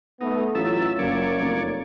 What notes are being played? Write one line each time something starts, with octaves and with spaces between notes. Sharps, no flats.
A3 B3 D#4
A1 F#3 F4 A4 E5
F#1 F#2 A#3 C#5 D5
F1